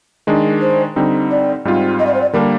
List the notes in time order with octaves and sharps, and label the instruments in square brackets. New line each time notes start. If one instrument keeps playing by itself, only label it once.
[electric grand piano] D#3 G#3 D4
[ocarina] C5
[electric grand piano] D3 G3 C4 D#4
[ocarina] D5
[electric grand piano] G#2 G3 C4 F4
[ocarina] D#5
D5
C5
D5
[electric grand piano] D3 G3 A#3 D4 [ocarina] A#4